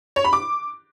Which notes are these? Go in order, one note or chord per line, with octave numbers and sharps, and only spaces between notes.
C#5
B5
D6